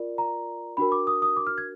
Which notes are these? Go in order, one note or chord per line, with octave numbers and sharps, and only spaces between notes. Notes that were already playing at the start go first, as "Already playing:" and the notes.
Already playing: F4 A#4 D5
A#5
D4 F#4 A#4 B5
D6
D#6
D#6
D6
F6
G#6